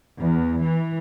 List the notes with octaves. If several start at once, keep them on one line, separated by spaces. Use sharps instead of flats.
E2
E3